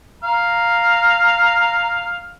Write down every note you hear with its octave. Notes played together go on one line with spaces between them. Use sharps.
F5 A#5